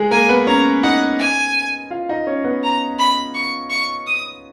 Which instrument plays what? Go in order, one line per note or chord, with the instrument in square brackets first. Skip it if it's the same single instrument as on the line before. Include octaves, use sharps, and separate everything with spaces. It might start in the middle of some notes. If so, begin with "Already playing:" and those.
Already playing: [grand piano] G#3 G#4
[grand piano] A#3 A#4 [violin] G#5
[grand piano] B3 B4
[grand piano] C#4 C#5 [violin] A#5
[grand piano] D#4 D#5 [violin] F#5
[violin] G#5
[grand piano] F4 F5
D#4 D#5
C#4 C#5
B3 B4
[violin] A#5
B5
C#6
C#6
D#6